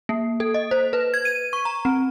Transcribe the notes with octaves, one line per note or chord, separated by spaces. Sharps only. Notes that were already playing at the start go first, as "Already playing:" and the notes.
A#3
A4
D#5
C5
B4
G#6
D#7
C#6
A#5
C4